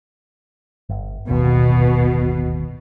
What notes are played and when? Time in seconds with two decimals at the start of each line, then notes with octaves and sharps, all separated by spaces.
0.89 G1
1.29 D1 G1 D#2 B2